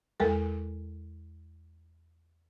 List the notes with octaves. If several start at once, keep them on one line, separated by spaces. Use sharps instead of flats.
E2 G#3 A4 A#4